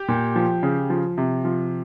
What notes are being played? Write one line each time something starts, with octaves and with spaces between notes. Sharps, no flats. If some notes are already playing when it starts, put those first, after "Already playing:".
Already playing: G4
A#2
F3
C#3
F3
C3
F3